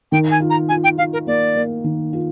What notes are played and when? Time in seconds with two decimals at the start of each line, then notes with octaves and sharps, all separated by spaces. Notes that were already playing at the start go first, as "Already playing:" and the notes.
0.12 D#3 G5
0.31 G#5
0.40 F4
0.50 A#5
0.69 F4 G#5
0.84 G5
0.98 F4 F5
1.13 A#4
1.27 A#3 D5
1.56 A#3
1.84 D#3
2.13 F4